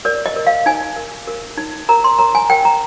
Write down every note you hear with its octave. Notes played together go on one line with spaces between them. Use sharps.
A#4 D5
D#5
A#4
F5
D#4 G#5
A#4
A#4
D#4
A#4 A#5
C6
A#4 A#5
G#5
A#4 G5
A#5